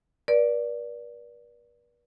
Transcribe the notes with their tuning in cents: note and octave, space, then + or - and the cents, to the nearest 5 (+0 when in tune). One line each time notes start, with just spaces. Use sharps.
B4 -45 D5 +0